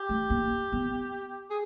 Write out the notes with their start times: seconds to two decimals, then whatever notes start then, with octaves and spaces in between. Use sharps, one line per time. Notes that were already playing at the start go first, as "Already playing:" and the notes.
Already playing: G4
0.09 A3
0.30 A#3
0.72 B3
1.50 G#4